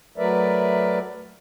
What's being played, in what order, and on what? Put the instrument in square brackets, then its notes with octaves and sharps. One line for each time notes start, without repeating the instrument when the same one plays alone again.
[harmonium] F#3 A3 A#4 B4 D5 E5